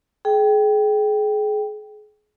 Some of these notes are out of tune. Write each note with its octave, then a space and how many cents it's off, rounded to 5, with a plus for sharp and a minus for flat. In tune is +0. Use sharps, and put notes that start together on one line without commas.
G#4 +30 G5 +0